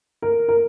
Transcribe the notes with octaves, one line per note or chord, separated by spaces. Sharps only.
A#4
A#4